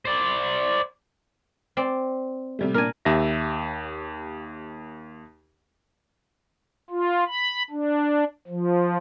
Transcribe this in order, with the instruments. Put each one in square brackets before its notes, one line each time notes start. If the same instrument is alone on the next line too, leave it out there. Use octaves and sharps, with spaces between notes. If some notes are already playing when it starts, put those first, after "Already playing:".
[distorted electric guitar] C5 D5
[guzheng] C4 D5
[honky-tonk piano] C3 G3 A3
[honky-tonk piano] A#2 A#3 D4 [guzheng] A#4 G#5
[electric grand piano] D#2 G4 E5 A#6
[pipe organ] F4
B5
D4
F3